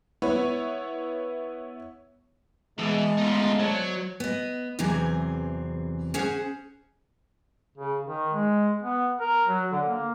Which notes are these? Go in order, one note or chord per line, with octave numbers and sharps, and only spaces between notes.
B3 E4 B4 C#5
B2 E3 G#3 E4 A5
A3 B3 D#4 F4
F#3 C5 C#5
B3 D#5
E2 C3 E3 F#3 C4 G#4
C#4 G#4 C5 F#5
C#3
D#3
G#3
B3
A#4
F#3
D3
A#3